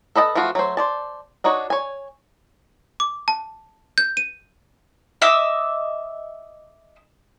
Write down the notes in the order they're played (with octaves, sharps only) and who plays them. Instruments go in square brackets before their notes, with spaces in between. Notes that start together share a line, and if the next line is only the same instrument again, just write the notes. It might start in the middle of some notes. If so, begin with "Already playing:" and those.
[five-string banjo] A4 B4 D#5 G5 A5
E3 F3 A3 F4 F#4
F#3 A3 C5
C5 D5 A5
D4 D#4 F#4 C#5
C#5 G#5
[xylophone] D6
A5
G6
D#7
[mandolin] D#5 E5 D6 E6